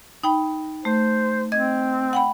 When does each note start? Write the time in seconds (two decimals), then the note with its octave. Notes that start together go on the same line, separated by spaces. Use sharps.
0.24 D#4 G5 B5
0.85 A3 C5
1.52 C4 D#5 G#6
2.13 F#5 G5 B5